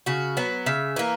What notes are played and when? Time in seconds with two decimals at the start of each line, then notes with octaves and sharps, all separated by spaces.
0.06 C#3 F#4
0.37 F#3 B3
0.66 C#3 E5
0.96 E3 A#3